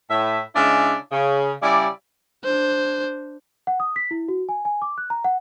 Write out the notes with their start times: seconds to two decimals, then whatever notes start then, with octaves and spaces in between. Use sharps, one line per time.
0.10 A2 E5
0.55 C#3 G#3 D4 E4 D5
1.12 C#3
1.63 C#3 G3 E4 D5
2.44 D4 C5
3.67 F#5
3.80 D#6
3.96 B6
4.11 E4
4.28 F#4
4.49 G#5
4.65 G#5
4.82 D6
4.98 F#6
5.10 A#5
5.24 F#5